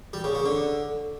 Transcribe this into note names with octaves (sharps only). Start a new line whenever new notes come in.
G3
C#3
C#3
D3